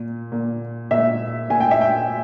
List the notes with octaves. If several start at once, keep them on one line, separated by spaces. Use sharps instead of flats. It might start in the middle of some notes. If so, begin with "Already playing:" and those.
Already playing: A#2
A#2
A#2 E5
A#2 G#5
G5
E5
G5